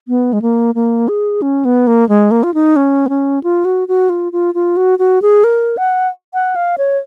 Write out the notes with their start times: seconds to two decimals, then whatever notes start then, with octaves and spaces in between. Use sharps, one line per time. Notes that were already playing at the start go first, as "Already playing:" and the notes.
0.08 B3
0.33 G#3
0.42 A#3
0.75 A#3
1.08 G#4
1.42 C#4
1.65 B3
1.87 A#3
2.09 G#3
2.31 A#3
2.43 F4
2.54 D#4
2.76 C#4
3.06 B3
3.09 C#4
3.44 F4
3.65 F#4
3.88 F#4
4.09 F4
4.32 F4
4.54 F4
4.77 F#4
4.99 F#4
5.22 G#4
5.44 A#4
5.77 F#5
6.34 F#5
6.56 F5
6.78 C#5